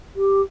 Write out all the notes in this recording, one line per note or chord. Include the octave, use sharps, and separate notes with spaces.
G4